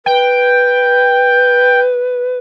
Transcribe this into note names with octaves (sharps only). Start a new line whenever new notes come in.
B4 G5